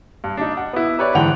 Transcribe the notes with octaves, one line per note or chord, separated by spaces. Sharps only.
G2
D4 D#4
F#5
B3 E4
G4 B4 C#5 D5
G#2 D3 E3 F#5 G5 F7